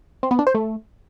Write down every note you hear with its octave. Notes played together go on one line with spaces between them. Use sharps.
C4
B3
D4
C5
A3